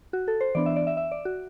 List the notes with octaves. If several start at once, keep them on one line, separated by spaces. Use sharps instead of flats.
F#4
A4
C5
E3 B3 D4 D5
E5
D5
E5
E5
D5
F#4